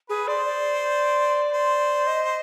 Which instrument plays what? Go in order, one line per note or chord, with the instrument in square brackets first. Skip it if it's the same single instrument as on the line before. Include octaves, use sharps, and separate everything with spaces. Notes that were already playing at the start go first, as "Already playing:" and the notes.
[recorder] G#4 [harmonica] B4
[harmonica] C5 [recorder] D5
[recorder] D5
[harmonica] C5
[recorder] D#5